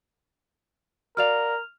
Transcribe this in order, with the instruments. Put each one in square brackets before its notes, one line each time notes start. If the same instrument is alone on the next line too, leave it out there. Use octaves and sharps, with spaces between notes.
[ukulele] F#4 D5 F5 [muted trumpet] A#4 [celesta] F6 F7